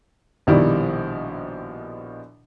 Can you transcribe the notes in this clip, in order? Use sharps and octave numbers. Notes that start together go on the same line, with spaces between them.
A#1 B2 D#3 G3 E4 D5